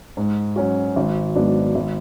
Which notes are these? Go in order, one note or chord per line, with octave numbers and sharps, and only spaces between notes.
G#2
F#3 C#4 F#4
G#1
G#2 F#3 B3 D4
G#1